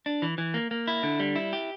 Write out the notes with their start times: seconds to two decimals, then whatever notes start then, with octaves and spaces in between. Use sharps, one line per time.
0.06 D4
0.22 E3
0.38 E3
0.54 A#3
0.71 A#3
0.88 E4
1.03 D3
1.19 G3
1.36 E4
1.53 G4